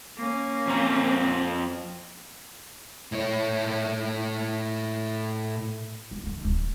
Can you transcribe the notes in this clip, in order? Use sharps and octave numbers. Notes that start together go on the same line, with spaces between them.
A#3 C#4
F2 C4 A#5
A2 C#5
B3
D3 A3
D1 D2